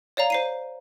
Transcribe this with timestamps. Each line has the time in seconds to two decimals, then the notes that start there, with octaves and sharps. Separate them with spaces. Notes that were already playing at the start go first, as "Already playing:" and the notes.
0.17 C#5 D5 F5 A#5
0.30 C5 C7 D#7